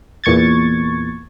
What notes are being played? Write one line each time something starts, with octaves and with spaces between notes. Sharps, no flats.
E2 A#2 C#6 G#6 A6